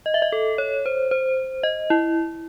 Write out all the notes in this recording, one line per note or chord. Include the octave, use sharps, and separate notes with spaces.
D#5
E5
D#5
A4
C#5
C5
C5
D#5
E4